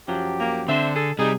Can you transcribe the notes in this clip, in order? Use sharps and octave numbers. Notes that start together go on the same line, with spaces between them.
F#2 F3 F#3 G4
A#3
D3 C4 D4 C5 E5
G#4 A4
C3 G3 D#4 G#4